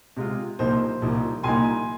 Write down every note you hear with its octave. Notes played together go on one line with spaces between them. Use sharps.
C3 G#3 F4
C2 A#2 F3 A#3 D#4 C5
C2 A#2 F3 A#3 D#4
C2 A#2 F3 A#3 D#4 G#5 C6